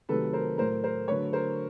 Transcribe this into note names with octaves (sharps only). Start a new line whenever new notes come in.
C3 D#3 F#3 A3 A4 B4
A#4 C5
A2 F#3 A3 A#4 C5
A#4 C5
D3 F#3 A3 B4 C#5
A#4 C5